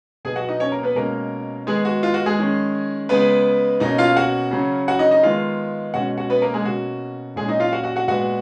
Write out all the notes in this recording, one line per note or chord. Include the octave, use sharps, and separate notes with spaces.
B2 F#3 B3 G#4 G#5
F#4 F#5
D#4 D#5
C#4 C#5
A#3 A#4
B3 B4
B2 G#3 A#3 C#4 A#4
D#3 G#3 B3 G#4
F#4
F4
F#4
G#3 G#4
D#3 G#3 C#4
C#3 G#3 B3 B4
B2 A#3 C#4 D#4 D#5
F4 F5
F#4 F#5
C#3 F#3 C#4
F#4 F#5
D#4 D#5
D#4 D#5
D#3 G#3 B3 F4 F5
B2 G#3 C#4 F#4 F#5
F#4 F#5
B3 B4
A#3 A#4
G#3 G#4
B2 A#3 C#4 F#4
A#2 F#3 G#3 C#4 G#4
D#4 D#5
F4 F5
F#4 F#5
F#4 F#5
F#4 F#5
A#2 G#3 B3 F#4 F#5